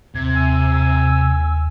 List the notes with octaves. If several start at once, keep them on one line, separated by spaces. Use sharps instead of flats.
D#2 C3 G#6
G#5 E6